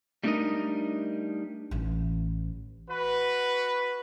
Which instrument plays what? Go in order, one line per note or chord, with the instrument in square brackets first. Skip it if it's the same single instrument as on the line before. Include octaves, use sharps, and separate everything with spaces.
[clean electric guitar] G3 A3 D4 D#4 A#4 D#5
[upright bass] A1 E3
[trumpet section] F#4 B4